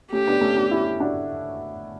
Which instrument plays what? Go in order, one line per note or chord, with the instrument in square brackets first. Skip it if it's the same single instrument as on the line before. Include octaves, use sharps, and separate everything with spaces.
[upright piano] A3 C#4 [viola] G4
[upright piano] B3 D4
A3 C#4
B3 D4
C#4 E4
D4 F#4